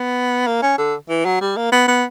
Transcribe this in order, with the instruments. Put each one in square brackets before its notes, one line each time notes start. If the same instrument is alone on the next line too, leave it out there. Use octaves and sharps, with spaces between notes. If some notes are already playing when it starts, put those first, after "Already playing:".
Already playing: [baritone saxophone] B3
A#3
C#4
D3
E3
F#3
G3
A#3
B3
B3